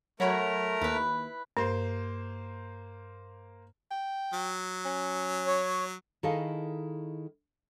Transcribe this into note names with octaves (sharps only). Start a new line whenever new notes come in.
F#3 A3 A#4 C#5 F#5 A#5 B5
D#2 E4 B4
G2 A#3 C5
G5
F#3
C#4
C#5
D#3 E4 G#4 A4 D#5 F5